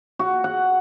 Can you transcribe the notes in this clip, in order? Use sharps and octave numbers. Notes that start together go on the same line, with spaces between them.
F#4
F#5